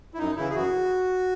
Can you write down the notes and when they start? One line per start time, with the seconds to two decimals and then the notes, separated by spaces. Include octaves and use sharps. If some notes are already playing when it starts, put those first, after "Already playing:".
0.14 E4
0.18 F#2 D#4
0.36 C#3 E3 E4
0.50 G#4
0.55 F#2 F#4